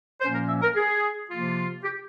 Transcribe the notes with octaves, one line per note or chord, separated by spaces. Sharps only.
A#2 F3 A#3 C#4 C5
A#4
E5
A#4
G#4
C3 F3 A#3 F4
G4